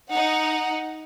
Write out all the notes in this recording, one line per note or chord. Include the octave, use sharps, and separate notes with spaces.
D#4 F#5